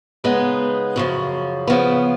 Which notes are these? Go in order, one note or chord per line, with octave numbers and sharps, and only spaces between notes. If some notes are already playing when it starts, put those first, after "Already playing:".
C#3 G#3 B3 D#4
F#2 C#3 F3
C#3 F3 B3